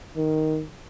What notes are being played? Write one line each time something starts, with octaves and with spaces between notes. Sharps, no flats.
D#3